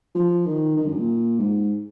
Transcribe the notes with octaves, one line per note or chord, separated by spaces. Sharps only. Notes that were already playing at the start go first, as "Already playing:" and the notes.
F3
D#3
D#3
F#2
A#2
G#2